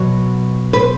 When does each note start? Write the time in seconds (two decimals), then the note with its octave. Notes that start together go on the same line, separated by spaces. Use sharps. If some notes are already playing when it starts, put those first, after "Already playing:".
Already playing: B2 F#3
0.73 B4
0.80 C5